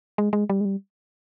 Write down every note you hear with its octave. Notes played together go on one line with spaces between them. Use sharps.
G#3
G#3
G3
G#3
G3